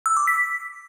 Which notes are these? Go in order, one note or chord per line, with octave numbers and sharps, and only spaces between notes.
E6
D6
B6